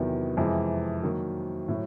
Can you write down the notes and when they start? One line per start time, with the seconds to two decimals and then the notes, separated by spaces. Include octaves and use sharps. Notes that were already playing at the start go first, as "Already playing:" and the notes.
Already playing: E2 C3 D#3 F#3 B3
0.37 F2 C3 E3 G#3
1.03 D#3 F#3 A#3
1.68 A2 F#3